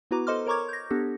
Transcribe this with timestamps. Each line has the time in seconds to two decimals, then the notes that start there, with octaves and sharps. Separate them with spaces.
0.11 B3 E4 F#4 B4 A#5 D6
0.27 A4 C5 D#5 C6 D6 F6
0.47 A#4 C#5 A#5 C#6 D6 G#6
0.69 G6 A#6
0.90 B3 D4 G4 A4